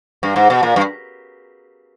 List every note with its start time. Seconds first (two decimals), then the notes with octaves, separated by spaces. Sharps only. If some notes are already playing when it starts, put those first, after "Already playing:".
0.23 G2
0.36 G#2
0.50 B2
0.63 A#2
0.76 G2